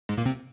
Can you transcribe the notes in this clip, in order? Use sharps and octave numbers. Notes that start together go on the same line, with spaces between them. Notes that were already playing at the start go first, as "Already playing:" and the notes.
G#2 G#3
A#2 A#3
C3 C4